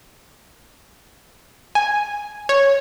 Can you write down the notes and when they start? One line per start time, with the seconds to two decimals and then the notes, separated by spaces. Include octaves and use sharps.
1.75 G#5
2.49 C#5